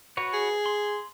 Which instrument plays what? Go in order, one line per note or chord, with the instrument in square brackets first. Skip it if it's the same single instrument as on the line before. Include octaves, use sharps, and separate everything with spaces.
[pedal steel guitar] F#4 B4 C#5
[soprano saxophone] G#4
[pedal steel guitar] C6